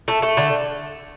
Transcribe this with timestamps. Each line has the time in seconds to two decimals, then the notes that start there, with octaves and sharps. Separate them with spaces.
0.08 A3
0.22 A3
0.37 D3